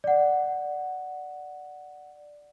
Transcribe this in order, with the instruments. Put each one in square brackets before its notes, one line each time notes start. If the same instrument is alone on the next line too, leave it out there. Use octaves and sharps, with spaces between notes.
[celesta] D5 F#5